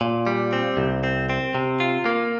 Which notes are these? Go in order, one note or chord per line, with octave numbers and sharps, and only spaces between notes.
A#2
G3
C4
C2
C4
C4
C3
F4
A#3